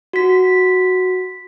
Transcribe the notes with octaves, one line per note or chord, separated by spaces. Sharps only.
F#4 B6